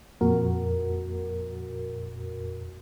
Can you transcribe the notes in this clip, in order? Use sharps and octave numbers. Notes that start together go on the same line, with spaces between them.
F2 A#2 F#4 A#4